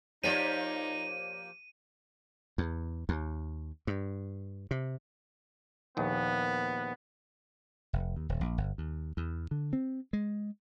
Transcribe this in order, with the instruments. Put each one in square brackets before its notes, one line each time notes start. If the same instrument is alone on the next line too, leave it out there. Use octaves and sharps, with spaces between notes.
[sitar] F3 A#3 G4 [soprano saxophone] D#4 [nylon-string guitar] C#5 D5 [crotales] D#7
[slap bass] E2
D#2
G2
C3
[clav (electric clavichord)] A#1 D#2 [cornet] B3
[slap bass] F1
D#2
D#1
A#1
G1
D#2
E2
D3
C4
G#3